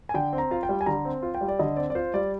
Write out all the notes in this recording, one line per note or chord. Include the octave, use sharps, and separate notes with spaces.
G#5
D3 G5
C4
A#5
F4 F5
G5
G3
G#5
D3 A#5
C4
F4
G5
G3
D5
D3 D#5
C4 D5
D5
F4 C5
G3 D5